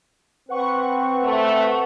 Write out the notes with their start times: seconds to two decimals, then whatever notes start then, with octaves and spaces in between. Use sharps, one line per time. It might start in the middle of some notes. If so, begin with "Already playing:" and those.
0.49 C4 B4 F#5 C#6
1.23 A3